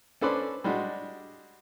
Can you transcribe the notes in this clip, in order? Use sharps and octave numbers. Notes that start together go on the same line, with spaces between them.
C#4 D4 A4 B4 C5 D5
G3 G#3 D4 F#4